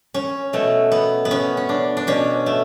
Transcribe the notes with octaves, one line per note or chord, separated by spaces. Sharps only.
C#4
B2 A3
B3
B3
C#4
C#4
D4
D4
B2 C#4
A3